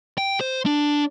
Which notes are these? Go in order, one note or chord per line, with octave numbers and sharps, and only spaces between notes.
G5
C5
D4